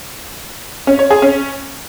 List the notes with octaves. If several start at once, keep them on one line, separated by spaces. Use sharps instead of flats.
C#4
C#5
G#4
C#4